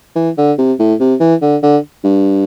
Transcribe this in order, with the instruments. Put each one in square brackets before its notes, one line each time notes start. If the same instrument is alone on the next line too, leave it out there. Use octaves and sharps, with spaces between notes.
[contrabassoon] E3
D3
C3
A2
C3
E3
D3
D3
G2